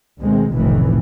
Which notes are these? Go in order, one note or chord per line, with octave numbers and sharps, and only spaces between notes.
D2 B2 D#3 G#3 C4
F1 B1 A2 C3 D#3 E3